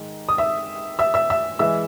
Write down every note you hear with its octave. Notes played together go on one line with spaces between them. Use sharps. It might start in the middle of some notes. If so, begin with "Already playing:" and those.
Already playing: G#2 D#3 G#3
D#6
E5 E6
E5 E6
E5 E6
E5 E6
E3 G#3 E5 E6